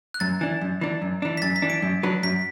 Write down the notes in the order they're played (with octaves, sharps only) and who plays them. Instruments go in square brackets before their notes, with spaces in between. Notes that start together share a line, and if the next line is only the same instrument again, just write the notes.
[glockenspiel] F#6
[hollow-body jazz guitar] F#2 [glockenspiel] A6
[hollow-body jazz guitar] E3 D4
F#2
E3 D4
F#2
E3 D4
[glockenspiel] B6
[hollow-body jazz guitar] F#2 [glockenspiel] A6
[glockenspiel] B6
[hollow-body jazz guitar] E3 D4
[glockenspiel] D7
[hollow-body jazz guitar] F#2
F#3 D4 B4
[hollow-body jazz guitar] F#2 [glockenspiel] B6